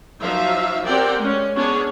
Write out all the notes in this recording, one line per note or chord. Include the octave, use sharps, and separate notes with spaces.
F3 F#3 D#4 E5 F5
C4 G4 A#4 D5 F#5 G5
G#3 C#4
B3 C#4 D4 G#4 C#5